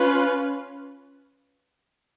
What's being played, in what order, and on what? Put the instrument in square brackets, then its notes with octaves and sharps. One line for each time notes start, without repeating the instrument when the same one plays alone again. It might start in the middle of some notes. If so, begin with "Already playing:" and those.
Already playing: [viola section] C#4 F4 B4